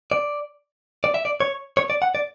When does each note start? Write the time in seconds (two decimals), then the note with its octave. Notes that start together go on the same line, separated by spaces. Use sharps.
0.12 D5
1.04 D5
1.14 E5
1.25 D5
1.40 C#5
1.77 C#5
1.90 D5
2.02 F#5
2.15 D5